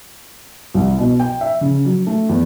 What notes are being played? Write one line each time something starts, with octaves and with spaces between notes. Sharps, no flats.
C2
B2
G5
E5
C#3
F#3
A3
E2